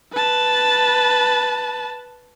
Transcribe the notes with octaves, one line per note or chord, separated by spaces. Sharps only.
B4 A5